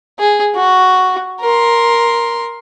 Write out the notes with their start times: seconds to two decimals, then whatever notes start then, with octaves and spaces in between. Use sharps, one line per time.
0.19 G#4
0.55 F#4
1.41 A#4 C6